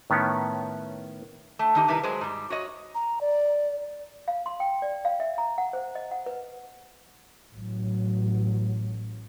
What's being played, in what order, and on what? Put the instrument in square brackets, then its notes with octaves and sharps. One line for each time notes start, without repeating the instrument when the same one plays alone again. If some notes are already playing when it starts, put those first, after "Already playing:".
[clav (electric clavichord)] A2 D#3 B3 C#4 C#5
[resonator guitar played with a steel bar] A3
D#3 D#4 G4
C3 D#3 G3 E4 B4
F#3 G#3 G#4 C5
G#2 G3
F#4 C#5 D#5
[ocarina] A#5
D5
[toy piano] F5
C6
G5
D5
F5
E5
A#5
F#5
C5
D#5
F#5
B4
[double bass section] A1 F#3